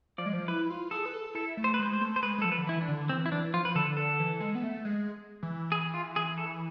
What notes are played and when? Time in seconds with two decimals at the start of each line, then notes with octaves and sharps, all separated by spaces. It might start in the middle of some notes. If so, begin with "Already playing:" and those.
0.18 F3 D5
0.26 G#3
0.33 F3
0.48 E4 B4
0.70 F4
0.91 G#4 A4
1.06 B4
1.14 A4
1.35 E4 A4
1.57 A3
1.64 C5
1.74 B4
1.79 G#3 C5
1.93 C5
2.01 A3
2.16 C5
2.22 G#3 B4
2.38 G#3
2.42 F3 A4
2.52 B4
2.58 D3
2.67 E3 E4
2.81 D4
2.88 D3
3.09 E3 C4
3.26 E4
3.32 E3 D4
3.54 F3 F4
3.65 B4
3.75 D3 A4
3.97 D3 A4
4.20 E3
4.40 G#3
4.55 B3
4.63 A3
4.85 G#3
5.43 E3
5.72 G#4
5.94 F4
6.16 G#4
6.38 A4